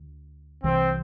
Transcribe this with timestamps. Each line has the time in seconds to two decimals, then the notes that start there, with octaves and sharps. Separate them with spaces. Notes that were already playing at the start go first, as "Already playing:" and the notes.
Already playing: D2
0.63 C2 C3 E3 C4